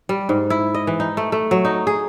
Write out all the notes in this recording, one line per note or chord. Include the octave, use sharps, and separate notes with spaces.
G3
G#2
E4
D#5
E3
D#4
A3
A3
F#3
D#4
G#4